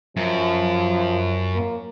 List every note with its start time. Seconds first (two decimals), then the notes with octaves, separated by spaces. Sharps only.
0.17 F#2 F3
1.55 A#3